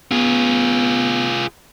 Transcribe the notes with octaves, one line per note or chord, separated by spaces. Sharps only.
B3 F4 G#4